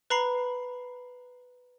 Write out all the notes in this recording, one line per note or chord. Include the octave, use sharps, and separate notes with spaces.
B4 A#5 B5 C7